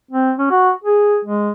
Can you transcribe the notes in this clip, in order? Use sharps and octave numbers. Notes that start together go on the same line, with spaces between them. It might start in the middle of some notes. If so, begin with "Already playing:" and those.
C4
C#4
F#4
G#4
G#3